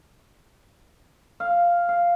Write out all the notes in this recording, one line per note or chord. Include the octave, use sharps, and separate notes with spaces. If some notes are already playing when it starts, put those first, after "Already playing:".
F5
F5